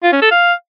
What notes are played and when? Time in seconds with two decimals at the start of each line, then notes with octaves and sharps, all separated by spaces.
0.03 F4
0.13 C#4
0.22 A4
0.31 F5